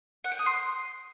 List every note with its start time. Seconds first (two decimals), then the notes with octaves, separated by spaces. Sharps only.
0.24 F#5
0.32 G5
0.39 D#6
0.46 C6